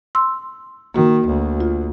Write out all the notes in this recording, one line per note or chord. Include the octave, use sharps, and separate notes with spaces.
C6 E6
D#3 A#3 F#4
D2
F4